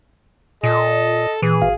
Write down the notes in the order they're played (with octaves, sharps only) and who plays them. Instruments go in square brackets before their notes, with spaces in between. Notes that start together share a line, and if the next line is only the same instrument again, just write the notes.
[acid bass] A#2 [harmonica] A4 [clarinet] D#5
[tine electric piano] A#2 [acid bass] E3 [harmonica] G#4
[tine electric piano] G#1 F5